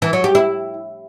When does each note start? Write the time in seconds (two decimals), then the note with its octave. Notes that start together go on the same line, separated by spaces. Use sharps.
0.02 E3
0.13 F#3
0.24 G4
0.35 E4